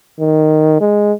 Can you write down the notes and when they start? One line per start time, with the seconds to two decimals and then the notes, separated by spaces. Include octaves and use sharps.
0.20 D#3
0.81 G#3